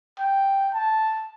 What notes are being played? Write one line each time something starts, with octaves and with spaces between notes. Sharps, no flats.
G5
A5